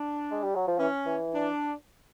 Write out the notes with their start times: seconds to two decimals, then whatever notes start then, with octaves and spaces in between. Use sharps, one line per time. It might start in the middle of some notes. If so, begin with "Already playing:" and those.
Already playing: D4
0.31 G#3
0.43 G3
0.55 F#3
0.68 F3
0.79 E3 C#4
1.06 E3
1.34 D4